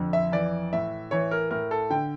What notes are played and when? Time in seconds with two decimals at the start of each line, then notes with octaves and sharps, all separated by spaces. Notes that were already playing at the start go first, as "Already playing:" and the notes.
Already playing: F2 D3
0.13 E5
0.32 E3 D5
0.73 A2 E5
1.11 E3 C#5
1.31 A#4
1.50 A2 A#4
1.71 A4
1.90 D3 G5